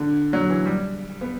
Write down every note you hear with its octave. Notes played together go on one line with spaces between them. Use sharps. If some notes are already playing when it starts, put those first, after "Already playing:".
Already playing: D3
F#3
E3
G3
B3